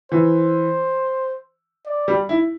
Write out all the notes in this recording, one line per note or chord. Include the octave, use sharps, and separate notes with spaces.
E3 C5
D5
G3
E4